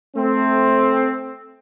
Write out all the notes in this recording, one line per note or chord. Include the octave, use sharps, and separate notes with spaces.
A3 C4